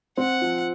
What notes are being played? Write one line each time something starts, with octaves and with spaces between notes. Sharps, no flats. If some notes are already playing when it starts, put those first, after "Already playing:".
C4 F#5
F3